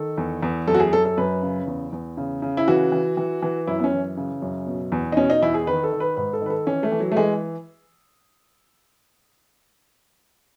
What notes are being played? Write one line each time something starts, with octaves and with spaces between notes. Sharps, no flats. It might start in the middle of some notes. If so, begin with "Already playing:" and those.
Already playing: D#3 A4
E2
E2
F#2 A4
F#4
G#4
F#2 A4
A4
F#2 B4
C#3
E2
E2
C#3
C#3
E4
E3 F#4
E3
E3
E3
F#2 E4
B3
C#4
E3
C#3
F#2
B2
E2
D#4
B2 C#4
D#4
E2 E4
G#4
D#3 B4
A4
D#3
B4
G#2 B4
A4
D#3 B4
A4
E3 C#4
A3
E3
F#3
A3
E3 G#3